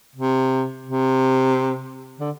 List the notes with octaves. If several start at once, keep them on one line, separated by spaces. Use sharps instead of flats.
C3
C3
D3